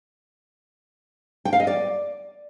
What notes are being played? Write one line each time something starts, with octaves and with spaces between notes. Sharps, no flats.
G5
F5
D#5
D5